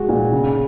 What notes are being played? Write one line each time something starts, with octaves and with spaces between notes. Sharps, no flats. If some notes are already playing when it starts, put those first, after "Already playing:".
Already playing: G#3 F#4
A#2
C#3